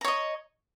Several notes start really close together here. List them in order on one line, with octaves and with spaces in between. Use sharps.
A#5 C#5 D#5